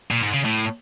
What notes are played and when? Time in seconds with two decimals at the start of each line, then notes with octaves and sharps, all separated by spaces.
0.11 A#2
0.22 G#2
0.33 C#3
0.44 A2